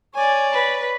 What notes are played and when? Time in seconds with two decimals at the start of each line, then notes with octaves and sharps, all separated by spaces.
0.14 C#5 D5 G#5
0.52 B4